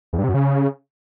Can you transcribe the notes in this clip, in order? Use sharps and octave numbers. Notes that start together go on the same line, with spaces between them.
E2
G2
C3
F#2
C#3